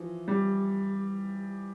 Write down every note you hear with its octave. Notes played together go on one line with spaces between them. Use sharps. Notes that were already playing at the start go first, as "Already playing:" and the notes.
Already playing: E3 F3
G3